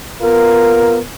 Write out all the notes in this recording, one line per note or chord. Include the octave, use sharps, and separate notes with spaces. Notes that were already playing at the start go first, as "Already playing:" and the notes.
B3 F4 A#4